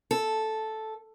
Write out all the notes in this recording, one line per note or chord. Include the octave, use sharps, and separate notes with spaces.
A4